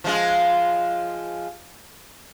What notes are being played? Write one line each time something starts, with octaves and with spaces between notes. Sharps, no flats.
F3 G#3 F4